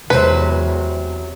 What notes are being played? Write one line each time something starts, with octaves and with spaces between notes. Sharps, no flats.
E2 C3 F#3 G#3 B4 C5